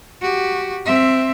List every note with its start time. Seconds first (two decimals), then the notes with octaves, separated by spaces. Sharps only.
0.22 F#4 G4
0.86 C4 E5